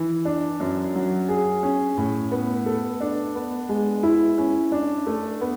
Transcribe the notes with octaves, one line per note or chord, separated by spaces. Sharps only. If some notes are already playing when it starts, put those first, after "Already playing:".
Already playing: E3
D4
F#2
F#3
G#4
C#4
A2
B3
A4
D4
B3
G#3
E4
C#4
D4
A3
B3